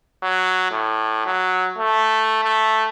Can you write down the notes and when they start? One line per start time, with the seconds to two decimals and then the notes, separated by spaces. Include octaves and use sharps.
0.23 F#3
0.72 A2
1.26 F#3
1.78 A3
2.44 A3